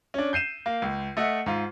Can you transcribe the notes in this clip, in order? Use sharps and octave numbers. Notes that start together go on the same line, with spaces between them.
C#4 D4
G6 C7 D#7 E7
A#3
C#2
A3 D#5 E5 F#5
G#2 F4